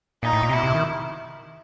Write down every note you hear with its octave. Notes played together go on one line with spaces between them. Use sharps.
A#2 D#4
A2
A#2
C3
B2 E4
C3
D#3